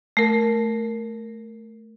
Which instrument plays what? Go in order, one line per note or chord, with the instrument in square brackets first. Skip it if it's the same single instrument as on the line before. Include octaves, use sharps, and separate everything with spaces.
[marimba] A3 A#4